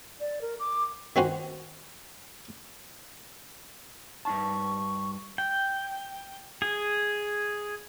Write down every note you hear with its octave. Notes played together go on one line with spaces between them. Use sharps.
D5
A#4
D6
D#3 C4 C#4 F#4 C5
G2 D#4 A5 C#6
G5
G#4